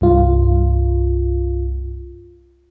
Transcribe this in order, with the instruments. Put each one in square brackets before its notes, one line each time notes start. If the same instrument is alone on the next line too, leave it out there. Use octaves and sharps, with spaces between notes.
[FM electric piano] C2 G2 F4